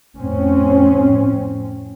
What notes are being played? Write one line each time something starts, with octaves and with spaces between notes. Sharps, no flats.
F2 A2 C4 C#4